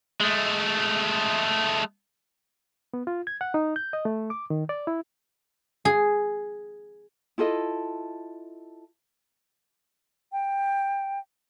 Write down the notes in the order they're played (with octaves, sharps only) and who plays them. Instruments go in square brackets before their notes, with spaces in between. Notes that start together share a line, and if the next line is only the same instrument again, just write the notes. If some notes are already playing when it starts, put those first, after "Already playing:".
[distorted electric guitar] G#3 A3
[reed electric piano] B3
F4
G#6
F#5
D#4
G6
D#5
A3
D6
D#3
D5
E4
[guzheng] G#4
[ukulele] E4 F4 A4 D#5
[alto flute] G5